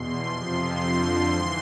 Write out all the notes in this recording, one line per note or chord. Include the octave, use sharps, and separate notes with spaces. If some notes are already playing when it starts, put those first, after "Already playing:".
Already playing: E2 B2 C6
F2 C3 F3 C6
F2 D3 F3 C6
G#2 E3 C6